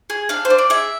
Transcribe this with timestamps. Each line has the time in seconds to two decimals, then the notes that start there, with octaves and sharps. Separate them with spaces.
0.10 G#4
0.29 D4 F5
0.45 C5
0.50 D4
0.58 D5
0.70 G#4 E5